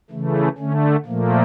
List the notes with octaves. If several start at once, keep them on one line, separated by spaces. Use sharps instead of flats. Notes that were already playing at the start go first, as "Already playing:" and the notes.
C#3 E3 A3
D3 A3 C#4
A#2 F3 A3 A#3